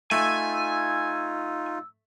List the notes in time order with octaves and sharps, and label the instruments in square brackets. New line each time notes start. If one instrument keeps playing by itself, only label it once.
[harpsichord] A3 [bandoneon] D#4 F4 [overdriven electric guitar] G#5 [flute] E6